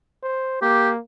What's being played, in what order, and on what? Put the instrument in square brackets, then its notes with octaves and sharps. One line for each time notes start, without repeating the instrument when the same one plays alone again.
[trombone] C5
[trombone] A#3 [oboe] G4